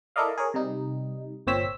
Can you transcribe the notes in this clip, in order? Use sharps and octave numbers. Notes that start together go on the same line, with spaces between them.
E4 A4 A#4 D5 D#5 F5
G#4 A#4 C#5
C3 G3 D#4
G1 A#2 C4 C#5 E6 B6